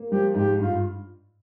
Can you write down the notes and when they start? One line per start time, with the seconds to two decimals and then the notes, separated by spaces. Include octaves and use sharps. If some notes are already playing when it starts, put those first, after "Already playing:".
Already playing: A#3
0.11 F3 G4
0.35 G#2 G4
0.59 G2 F4